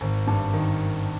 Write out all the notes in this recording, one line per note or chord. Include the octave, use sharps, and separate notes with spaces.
G#1
G2
D#3